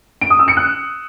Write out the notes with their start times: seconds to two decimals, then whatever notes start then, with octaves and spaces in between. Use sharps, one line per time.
0.21 D7
0.30 D#6
0.39 E6
0.48 C#7
0.57 F#6